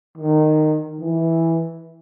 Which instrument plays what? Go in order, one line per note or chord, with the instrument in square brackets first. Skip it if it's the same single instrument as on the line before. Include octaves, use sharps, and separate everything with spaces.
[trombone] D#3
E3